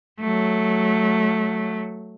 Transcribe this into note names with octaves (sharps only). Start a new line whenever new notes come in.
F#3 A3